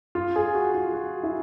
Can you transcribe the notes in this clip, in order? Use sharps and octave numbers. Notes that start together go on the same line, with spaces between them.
F4
G#4
F#4
F4
F#4
E4